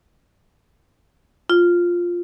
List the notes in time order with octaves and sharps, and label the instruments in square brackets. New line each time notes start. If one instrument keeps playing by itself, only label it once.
[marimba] F4